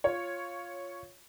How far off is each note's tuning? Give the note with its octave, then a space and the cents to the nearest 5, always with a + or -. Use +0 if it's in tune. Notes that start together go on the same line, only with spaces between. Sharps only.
F4 +0 C#5 +0